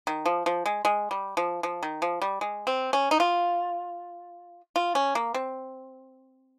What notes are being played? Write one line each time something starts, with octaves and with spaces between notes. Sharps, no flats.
D#3
F3
F3
G#3
G#3
G3
F3
F3
D#3
F3
G3
G#3
C4
C#4
D#4
F4
F4
C#4
A#3
C4